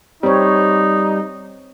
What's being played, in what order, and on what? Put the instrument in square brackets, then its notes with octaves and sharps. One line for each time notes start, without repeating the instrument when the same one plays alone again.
[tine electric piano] G3 [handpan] C4 C#5 [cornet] D#4